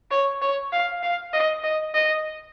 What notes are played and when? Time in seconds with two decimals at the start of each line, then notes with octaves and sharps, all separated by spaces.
0.11 C#5
0.42 C#5
0.72 F5
1.03 F5
1.33 D#5
1.64 D#5
1.94 D#5